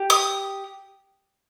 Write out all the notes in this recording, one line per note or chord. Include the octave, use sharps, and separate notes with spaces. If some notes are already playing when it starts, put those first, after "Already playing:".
Already playing: G4
D#6